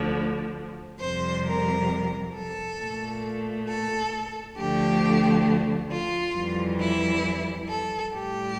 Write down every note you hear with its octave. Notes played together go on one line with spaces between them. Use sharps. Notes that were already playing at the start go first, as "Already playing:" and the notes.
Already playing: D2 D3 F3
F2 C3 G3 C5
A#4
A4
A#2 A3
A4
D2 D3 F3 A3 G4
F4
F2 E3 G3
E4
A4
A2 G3 G4